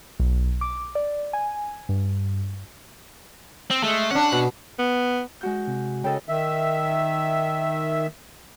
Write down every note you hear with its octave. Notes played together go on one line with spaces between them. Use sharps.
B1
D6
D5
G#5
G2
C4
G#3 A3
C#4 D4 F#5
B2
B3
G#3 F#4 G6
C3
C#3 A4 D#5 G5
D#3 E5